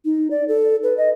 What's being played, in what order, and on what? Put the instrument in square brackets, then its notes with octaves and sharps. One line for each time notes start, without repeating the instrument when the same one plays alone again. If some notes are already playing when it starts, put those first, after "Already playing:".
[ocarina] D#4
D5
A4
B4
D#5